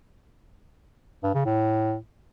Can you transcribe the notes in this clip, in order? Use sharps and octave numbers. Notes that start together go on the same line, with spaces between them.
G2
C#3
A2